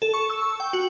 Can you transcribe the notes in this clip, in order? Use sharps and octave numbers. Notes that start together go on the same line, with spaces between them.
A4
C#6
E6
C#6
G5
F#4